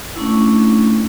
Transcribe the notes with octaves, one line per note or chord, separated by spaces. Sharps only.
A3 C#4 D4 E4